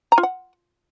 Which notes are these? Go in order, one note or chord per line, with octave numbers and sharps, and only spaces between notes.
A#5
F4
F#5